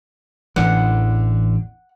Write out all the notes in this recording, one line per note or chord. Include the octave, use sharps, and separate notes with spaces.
A1 E2 D3 F#5